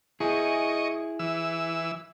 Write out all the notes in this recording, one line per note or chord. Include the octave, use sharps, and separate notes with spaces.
E4 G#4 D#5 C#6
E3 E6